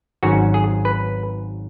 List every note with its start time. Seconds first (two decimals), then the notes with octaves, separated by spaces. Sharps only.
0.23 G#1 G#2 F#3 C#4 F#4
0.54 G#4
0.85 B4